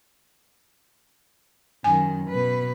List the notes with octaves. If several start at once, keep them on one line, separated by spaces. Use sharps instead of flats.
F#2 D#3 G#5
B2 B4